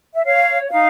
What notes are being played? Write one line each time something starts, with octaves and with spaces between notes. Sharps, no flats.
E5
C#5 F5
D#4 F5